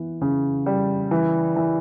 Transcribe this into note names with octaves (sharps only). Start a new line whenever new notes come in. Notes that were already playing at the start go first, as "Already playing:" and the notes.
Already playing: E3 B3
C#3
G3
E3
E3